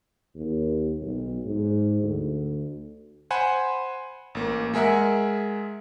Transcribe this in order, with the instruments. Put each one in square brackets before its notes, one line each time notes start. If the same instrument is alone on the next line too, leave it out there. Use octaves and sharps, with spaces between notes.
[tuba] D#2
B1
G#2
D2
[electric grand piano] C5 F#5 G#5 B5
A1 A#3
G#3 G#4 A#4 E5 F#5